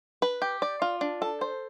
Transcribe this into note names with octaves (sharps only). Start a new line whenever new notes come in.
B4
G4
D5
F4
D4
A4
C5